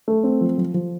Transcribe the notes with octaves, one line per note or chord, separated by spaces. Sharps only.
A3
C4
F3
F3
F3